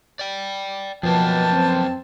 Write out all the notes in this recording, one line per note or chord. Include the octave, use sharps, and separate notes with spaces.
D5 G5
F#2 B2 F3 A#3 B4 G5 A5
C4